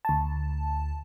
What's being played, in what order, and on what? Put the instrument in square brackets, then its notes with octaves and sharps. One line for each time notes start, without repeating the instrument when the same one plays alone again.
[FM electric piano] D2 A5